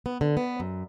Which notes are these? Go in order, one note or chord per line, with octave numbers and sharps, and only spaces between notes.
B3
D3
B3
F#2